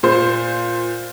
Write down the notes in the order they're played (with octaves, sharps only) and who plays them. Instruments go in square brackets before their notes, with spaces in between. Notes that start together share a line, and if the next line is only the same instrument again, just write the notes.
[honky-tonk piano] A#2 C5